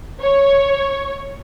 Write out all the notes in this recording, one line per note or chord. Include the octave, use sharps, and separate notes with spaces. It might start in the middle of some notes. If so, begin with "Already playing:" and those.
C#5